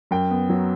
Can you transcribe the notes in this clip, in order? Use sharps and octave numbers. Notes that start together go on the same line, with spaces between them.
F#2 G5
B3
F#3